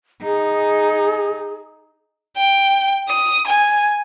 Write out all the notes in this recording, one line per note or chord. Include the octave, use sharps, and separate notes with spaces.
D#4 G#4
G5
D#6
G#5